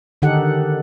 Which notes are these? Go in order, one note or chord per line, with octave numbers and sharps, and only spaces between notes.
D3 D#3 D#4 G4 A4 F#5